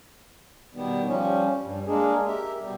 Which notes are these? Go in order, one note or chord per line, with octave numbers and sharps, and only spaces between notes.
B2 D#3 G3 B3
F3 G3 C#4
G2
G#3 A#3 D4 G#4
G4 A#4 E5
B2 G3